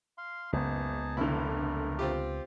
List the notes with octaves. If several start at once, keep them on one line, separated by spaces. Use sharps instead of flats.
F5 C6
F#1 C#2 B3 D#4 G#4 A5
F1 D3 A3 E4 A#4
C4 F4 G4